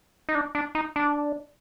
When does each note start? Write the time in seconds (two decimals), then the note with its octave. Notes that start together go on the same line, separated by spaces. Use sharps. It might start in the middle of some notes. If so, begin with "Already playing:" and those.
0.29 D#4
0.35 D4
0.55 D4
0.75 D#4
0.96 D4